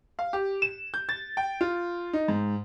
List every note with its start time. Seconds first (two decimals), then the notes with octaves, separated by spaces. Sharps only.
0.19 F5
0.33 G4
0.62 E7
0.94 G6
1.09 A6
1.37 G5
1.61 F4
2.13 D#4
2.28 G#2